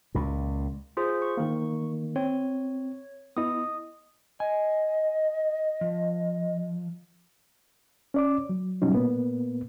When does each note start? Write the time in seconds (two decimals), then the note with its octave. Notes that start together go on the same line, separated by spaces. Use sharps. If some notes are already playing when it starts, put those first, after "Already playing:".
0.15 C#2 A#2
0.97 F4 G#4 C5
1.22 C#6
1.37 D#3 A#3
2.16 C4 C#5
3.37 B3 E4 D#5 D#6
4.40 D#5 G#5
5.81 F3
8.14 C#4 D5 D6
8.49 F#3
8.82 B2 F#3 G3 C#4 D#4
8.94 A#2 A#3 B3